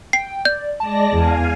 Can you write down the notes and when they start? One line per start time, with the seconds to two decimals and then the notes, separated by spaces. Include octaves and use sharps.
0.13 G5 C7
0.45 D5 G6
0.80 G#3 D5 A5 A#6
1.12 E2 F5 G#5